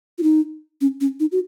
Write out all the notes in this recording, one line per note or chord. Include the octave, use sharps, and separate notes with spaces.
F4
D#4
C#4
C#4
D#4
F#4